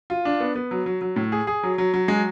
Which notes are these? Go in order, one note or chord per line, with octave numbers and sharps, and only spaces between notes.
F4
D4
B3
B3
F#3
F#3
F#3
A2
G#4
G#4
F#3
F#3
F#3
G#3